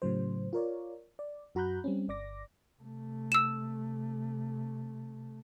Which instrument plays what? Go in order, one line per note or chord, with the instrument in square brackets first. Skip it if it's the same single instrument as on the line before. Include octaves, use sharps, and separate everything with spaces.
[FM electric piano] A2 C#3 F#3 C5
F4 A#4 C#5 D5
D5
F#2 F#4 A#5 B5 F#6 G6
G3 C4 C#4
G1 D5 D6 A#6
[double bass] C3 A3
[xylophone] E6 E7